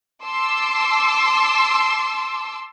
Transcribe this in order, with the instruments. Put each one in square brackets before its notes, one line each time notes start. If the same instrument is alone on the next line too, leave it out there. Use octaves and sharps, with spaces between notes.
[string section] A5 C6 D6 E6